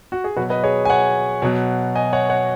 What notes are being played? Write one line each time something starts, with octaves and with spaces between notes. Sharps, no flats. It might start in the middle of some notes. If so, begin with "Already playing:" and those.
F#4
G#4
B2 F#3 F#4 B4
B4 D#5
G#4 C#5
G#5
C#5 F#5
B2 F#3
D#5 G#5
C#5 F#5
C#5 F#5